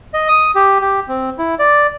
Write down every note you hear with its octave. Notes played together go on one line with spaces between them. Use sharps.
D#5
D#6
G4
G4
C4
E4
D5